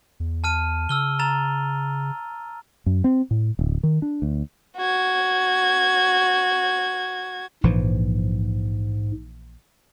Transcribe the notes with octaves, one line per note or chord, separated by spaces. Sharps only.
E2
A5 F6 D#7
C#3 E6 F6 G7
A#5 A6 F7
F#2
C4
A2
D1
D#3
D4
D2
F#4 G#6
A#1 G#2 E3 F3